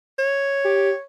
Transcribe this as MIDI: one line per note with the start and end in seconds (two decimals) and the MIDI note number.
0.19 1.02 73
0.65 0.91 67